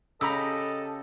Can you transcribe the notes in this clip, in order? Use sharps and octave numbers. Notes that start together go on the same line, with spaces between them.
C#3 G4 A4 D#5 A#5 B5 E6